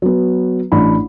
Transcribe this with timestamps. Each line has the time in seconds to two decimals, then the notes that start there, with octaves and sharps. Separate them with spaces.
0.02 F#3 B3
0.72 A1 D4 B5